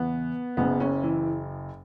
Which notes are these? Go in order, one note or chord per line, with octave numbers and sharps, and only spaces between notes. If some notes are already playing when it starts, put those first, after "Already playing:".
Already playing: E2 C#3 E3 B3
F#1 F#2 C#3 B3
C#4
E3